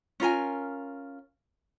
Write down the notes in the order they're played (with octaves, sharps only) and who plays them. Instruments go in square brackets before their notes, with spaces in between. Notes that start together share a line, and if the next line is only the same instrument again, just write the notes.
[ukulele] C#4 F4 A#4 G#5